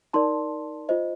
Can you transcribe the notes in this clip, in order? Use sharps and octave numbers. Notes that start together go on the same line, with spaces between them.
D#4 A#4 D5 A5 C6
F4 C5 D#5